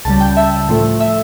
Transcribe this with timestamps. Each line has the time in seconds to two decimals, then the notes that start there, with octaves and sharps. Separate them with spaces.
0.05 C#2 C#3 G3 A5
0.20 G5
0.37 E5
0.68 A2 F3 A3
1.00 E5